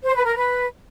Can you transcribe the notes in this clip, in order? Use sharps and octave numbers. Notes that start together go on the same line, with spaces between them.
C5
B4
A#4
B4